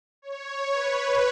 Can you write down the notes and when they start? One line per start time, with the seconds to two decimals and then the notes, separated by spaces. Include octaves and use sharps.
0.22 C#5
0.72 B4